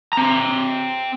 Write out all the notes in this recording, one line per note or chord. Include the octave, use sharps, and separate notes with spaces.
C4 A#5